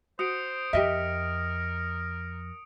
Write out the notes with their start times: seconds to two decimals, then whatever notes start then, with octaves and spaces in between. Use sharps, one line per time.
0.19 F#4 C5 D#6 C#7 D7
0.73 F2 G4 A#4 D#5 E5